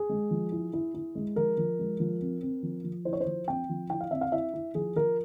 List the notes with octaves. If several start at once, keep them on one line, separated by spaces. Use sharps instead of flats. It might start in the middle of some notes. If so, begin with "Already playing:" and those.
Already playing: G#4
G#3
F3
E4
E4
E4
G#3
F3 A#4
F3
G#3
F3
C4
C4
F3
F3
E4 C5
C#5
C5
F3
C4 G5
F3
E4 G5
F5
C4 E5
F5
E4 E5
E4
F3 G#4
F3 A#4